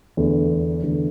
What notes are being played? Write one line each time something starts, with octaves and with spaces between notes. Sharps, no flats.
E2 D3 A3
E2 D3 A3